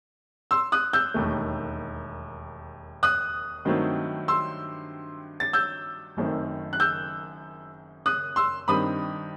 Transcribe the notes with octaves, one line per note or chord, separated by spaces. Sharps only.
C6 E6
D#6 F#6
E6 G6
E1 D#2 D#3 A3
D#6 F#6
G2 D#3 F#3 A3 C4
C6 E6
A6
E6 G6
F#1 F#2 D#3 A3 C4
F#6
E6 G6
D#6 F#6
C6 E6
G2 D#3 G3 C4 B5 D#6